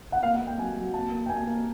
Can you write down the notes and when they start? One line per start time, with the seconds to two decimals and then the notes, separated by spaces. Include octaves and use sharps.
0.12 F#5
0.23 A#3 F5
0.35 F#5
0.41 A#3
0.47 G5
0.58 F#3 G#5
0.77 F#3
0.94 A#3 A5
1.11 A#3
1.26 G5
1.29 A#3 G#5
1.47 A#3